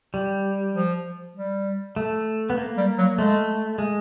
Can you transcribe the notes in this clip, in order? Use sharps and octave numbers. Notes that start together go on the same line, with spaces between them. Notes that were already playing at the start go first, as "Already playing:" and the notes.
G3
F3
G3
A3
B3
A#3
G3
F#3
G#3 A3
G#3